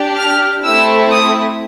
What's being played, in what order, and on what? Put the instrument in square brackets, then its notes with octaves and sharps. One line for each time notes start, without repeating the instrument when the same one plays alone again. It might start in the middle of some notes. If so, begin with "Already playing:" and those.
Already playing: [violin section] D4 G4
F6
A3 C4 E4 E6
D#6